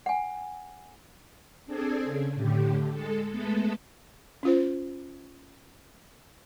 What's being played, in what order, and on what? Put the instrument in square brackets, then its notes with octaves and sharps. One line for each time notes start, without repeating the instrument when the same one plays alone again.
[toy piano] F#5 G#5
[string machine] C4 D4 G#4 A4 G#5
C#3
A2 D3 G4
G#3 A4
G#3 A3 B3 A4
[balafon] C#4 F4 C5